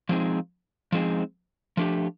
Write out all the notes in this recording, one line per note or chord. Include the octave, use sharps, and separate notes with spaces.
F3 G#3 C4 D#4 G#4
F3 G#3 C4 D#4 G#4
F3 A3 D4 G4